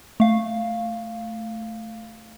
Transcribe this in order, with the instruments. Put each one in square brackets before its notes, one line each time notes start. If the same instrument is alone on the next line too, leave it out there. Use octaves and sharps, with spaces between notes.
[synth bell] A3 F5